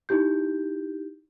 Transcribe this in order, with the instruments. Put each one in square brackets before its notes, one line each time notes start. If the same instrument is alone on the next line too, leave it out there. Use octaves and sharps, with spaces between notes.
[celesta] D#4 E4 G4 G6